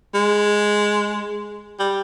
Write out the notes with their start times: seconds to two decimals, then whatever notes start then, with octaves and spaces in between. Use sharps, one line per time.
0.15 G#3
1.79 G3